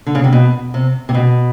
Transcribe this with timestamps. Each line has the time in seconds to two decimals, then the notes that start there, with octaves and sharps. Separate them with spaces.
0.07 D3
0.15 C#3
0.24 C3
0.33 B2
0.74 C3
1.09 C3
1.14 B2